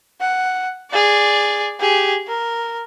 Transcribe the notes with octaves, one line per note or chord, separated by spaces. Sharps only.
F#5
G#4 D5
G4 G#4
A#4